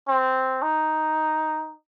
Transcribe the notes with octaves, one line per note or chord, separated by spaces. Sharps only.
C4
D#4